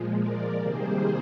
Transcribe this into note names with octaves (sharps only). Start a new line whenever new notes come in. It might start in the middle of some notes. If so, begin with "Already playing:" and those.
Already playing: A#2 F3 G#3
A#4 D5
C3 D#3 G3 A#3 G#4 C5